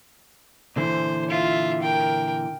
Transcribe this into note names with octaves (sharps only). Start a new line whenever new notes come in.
A#2 D3 E3 C5
F4 E5
A#4 G5